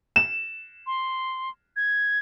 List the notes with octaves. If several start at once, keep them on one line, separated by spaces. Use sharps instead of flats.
E7
C6
G#6